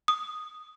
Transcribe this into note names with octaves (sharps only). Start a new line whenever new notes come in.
D#6